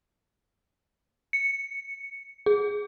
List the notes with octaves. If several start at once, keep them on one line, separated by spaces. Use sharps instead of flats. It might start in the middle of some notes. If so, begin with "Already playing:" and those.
C#7
G#4